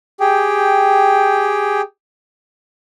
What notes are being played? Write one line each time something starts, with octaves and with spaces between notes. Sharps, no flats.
G4 G#4 G5